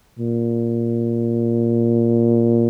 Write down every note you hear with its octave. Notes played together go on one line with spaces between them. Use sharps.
A#2